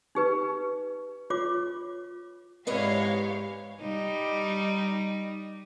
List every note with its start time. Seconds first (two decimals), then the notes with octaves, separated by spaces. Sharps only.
0.15 D#4 G4 B4
1.30 F4 C#5 D6
2.67 E2 G#2 G#3 G4 B4 C#5 D#5 F5
3.81 G3 D#4